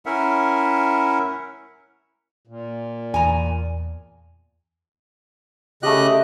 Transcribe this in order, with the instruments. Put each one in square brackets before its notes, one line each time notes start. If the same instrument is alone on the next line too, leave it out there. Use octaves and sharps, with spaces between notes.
[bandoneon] C#4 E4 A#4 E5 F#5
[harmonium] A#2
[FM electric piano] E2 [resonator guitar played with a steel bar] G#5 A#5
[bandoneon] C#3 D#5 F#6 [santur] A3 G4